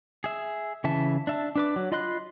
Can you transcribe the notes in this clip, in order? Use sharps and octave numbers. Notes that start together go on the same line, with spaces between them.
G#4 E5
C#3 E3 E5 A5
D4 E5 A5
D4 B4 D6
F#3
F4 D#5 B5 C6 F#6